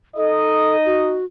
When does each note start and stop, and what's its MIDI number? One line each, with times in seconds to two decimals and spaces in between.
0.16 1.19 63
0.16 0.76 69
0.16 1.19 75
0.86 1.25 66